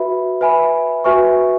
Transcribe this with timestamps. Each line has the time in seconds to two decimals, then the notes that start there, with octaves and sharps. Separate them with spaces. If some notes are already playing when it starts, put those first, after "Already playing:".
Already playing: F#4 B4 E5 B5
0.41 B4 E5 G#5 B5
1.04 F#4 B4 E5 G#5 C#6